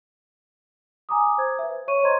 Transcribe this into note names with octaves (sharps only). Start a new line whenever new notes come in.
G#5 A#5 D6 D#6
C5 G#6
B4 E5
C#5 C#6 D#7
C5 D#5 A#5 C6 G#6